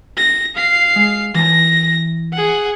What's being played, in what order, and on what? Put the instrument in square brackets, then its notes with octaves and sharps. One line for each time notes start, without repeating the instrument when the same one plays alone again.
[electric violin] A#6
F5 C7
[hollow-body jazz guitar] G#3
[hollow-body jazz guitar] E3 A5 [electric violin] A#6
[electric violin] G#4 F#5